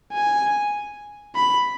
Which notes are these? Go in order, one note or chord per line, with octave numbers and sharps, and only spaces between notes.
G#5
B5